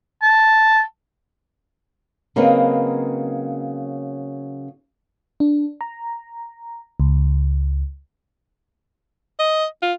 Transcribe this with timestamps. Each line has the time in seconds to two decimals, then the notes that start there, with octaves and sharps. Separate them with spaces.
0.23 A5
2.36 C#3 F#3 A#3 C4 D#4 B4
5.40 D4
5.81 A#5
7.00 C#2
9.39 D#5
9.82 F4